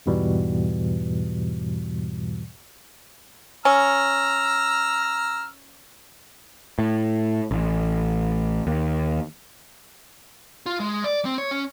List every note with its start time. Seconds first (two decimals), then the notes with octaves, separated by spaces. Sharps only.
0.06 E2 G#2 B2 E3 G3
3.65 C#4 A#5 E6 F6
6.79 A2
7.51 A1
8.67 D#2
10.66 F4
10.80 G#3
11.04 D5
11.25 C4
11.38 C#5
11.51 C#4